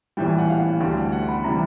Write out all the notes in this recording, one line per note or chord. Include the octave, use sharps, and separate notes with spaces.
A#1 A2 E3 G3 G5
G#5
F#5
F5
D2 D3 G3
F#5
B5
C3 E3 G3 A#5